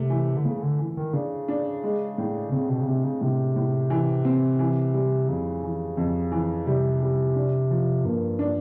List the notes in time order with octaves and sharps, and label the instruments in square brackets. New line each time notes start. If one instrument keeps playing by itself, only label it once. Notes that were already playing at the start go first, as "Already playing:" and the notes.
Already playing: [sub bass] C3 [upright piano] A3
[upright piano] E3
[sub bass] D3
[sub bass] C#3 [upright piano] A3
[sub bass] D3
[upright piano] E3
[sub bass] D#3
[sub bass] C#3 [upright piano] D4
[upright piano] D4
G#3
A2
[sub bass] C#3 [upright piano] C4
[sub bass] B2
C#3
[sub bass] C3 [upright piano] C4
[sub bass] C#3
[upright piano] A2 [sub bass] C3
[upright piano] A2
E3
C4
E3
G3
[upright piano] F2 [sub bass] C#3
[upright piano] E3
F2
E3
[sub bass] C3 [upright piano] G3
[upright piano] G3
D4
F3
[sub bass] G2 [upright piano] A#3
[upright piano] D4